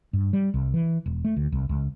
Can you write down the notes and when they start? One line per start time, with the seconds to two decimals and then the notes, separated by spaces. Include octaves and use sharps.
0.13 G2
0.33 G3
0.54 C2
0.74 E3
1.06 E1
1.25 A3
1.36 D2
1.52 C2
1.69 C#2